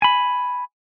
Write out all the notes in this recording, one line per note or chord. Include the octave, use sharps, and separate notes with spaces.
G#5 B5